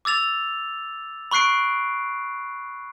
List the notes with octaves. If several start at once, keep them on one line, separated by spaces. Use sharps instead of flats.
D6 E6 A6 F7
B5 C#6 F#6 C7 D7